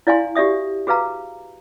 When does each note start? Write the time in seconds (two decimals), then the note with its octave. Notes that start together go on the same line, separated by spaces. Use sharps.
0.07 E4 D5 F5 G#5 C6
0.35 F#4 G4 D5 E5 D#6
0.87 F#4 G#4 B4 F5 A#5